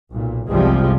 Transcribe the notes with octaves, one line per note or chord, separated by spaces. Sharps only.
B1 A#2
G1 C2 C3 F3 G3 G#3